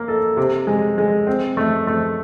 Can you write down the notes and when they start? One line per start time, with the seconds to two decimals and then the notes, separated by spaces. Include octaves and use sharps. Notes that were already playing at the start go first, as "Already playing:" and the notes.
Already playing: A#3
0.08 A4
0.37 C3
0.67 G#3
0.98 G#3
1.27 C4
1.57 A3
1.87 A3